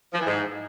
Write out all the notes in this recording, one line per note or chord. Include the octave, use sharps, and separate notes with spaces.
F3
E3
G#2